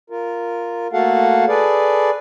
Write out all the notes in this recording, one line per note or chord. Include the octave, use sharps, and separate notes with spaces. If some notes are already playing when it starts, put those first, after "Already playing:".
F4 A#4
A3 A#3 F#4 A4 F5 F#5
G#4 A4 B4 D5